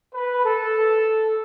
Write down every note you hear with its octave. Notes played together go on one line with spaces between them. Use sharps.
B4
A4